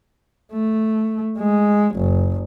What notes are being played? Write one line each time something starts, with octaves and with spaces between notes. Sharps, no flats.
A3
G#3
F#1